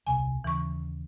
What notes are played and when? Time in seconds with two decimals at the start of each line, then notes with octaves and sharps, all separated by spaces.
0.07 D#1 C2 C3 G#5
0.44 D#2 C#3 E3 C#6